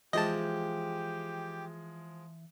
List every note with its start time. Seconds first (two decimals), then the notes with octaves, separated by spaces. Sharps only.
0.13 E3 F3 G#3 G4 D#5 E5 G5 A5